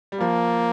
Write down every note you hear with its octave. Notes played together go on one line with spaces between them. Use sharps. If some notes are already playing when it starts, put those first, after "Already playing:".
G3
F3 A#3